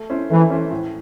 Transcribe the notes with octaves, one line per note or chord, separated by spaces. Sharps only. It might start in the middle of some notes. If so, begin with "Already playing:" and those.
Already playing: A3
C#4 E4 C5
E3 A3
C#4 E4 C5
A2